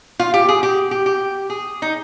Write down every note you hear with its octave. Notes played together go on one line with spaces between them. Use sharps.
F4
G4
G#4
G4
G4
G4
G#4
D#4